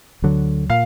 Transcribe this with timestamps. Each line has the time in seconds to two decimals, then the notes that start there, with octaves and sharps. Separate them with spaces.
0.22 D2 D3 F#3
0.70 A#2 F5